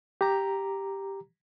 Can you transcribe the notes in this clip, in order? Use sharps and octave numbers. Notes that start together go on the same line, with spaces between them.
G4 A#5